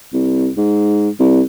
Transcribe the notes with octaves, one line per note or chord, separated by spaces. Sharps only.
C2
G#2
C2